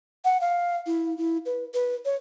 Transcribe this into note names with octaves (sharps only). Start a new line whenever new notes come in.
F#5
F5
E4
E4
B4
B4
C#5